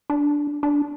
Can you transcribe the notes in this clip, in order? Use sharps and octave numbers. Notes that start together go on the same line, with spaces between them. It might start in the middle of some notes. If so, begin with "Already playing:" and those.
D4
D4